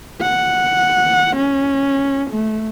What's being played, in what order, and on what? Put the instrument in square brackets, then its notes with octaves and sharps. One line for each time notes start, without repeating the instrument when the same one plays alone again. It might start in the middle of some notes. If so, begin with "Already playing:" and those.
[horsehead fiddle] F#5
C#4
A3